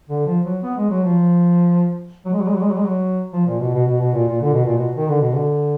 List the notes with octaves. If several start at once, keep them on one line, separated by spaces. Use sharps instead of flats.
D3
F3
F#3
B3
G#3
F#3
F3
F#3
G#3
F#3
G#3
F#3
G#3
F#3
G#3
F#3
F3
A#2
B2
B2
B2
B2
A#2
A#2
D3
B2
A#2
B2
D#3
D3
B2
D3